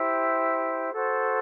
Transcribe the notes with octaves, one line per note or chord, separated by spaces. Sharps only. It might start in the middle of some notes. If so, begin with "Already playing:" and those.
Already playing: E4 G4 C5
F#4 A4 C5